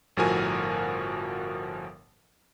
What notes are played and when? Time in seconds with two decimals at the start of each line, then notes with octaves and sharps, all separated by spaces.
0.17 G1 A2 F3 F#4 A#4 G#5